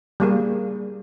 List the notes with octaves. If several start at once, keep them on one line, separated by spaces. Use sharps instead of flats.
G3 A#3 G#4